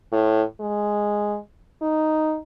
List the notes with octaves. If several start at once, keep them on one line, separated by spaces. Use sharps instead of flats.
A2
G#3
D#4